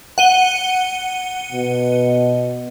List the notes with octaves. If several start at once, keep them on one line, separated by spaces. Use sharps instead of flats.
F#5 D#7 G7
B2